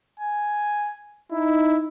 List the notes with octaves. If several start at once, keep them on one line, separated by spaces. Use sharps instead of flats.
G#5
D#4 E4